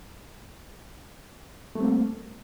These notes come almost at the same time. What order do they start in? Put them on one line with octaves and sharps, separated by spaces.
A3 G3 C4 A#3